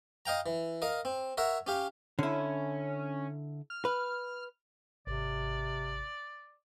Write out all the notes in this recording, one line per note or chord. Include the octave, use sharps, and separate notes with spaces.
D#5 F5 G5 A#5
E3
A#4 D#5 F5
C4
A#4 C#5 E5 F#5
C#4 G4 F5
D3 C#4 E4
F6
B4
G#1 C3 D5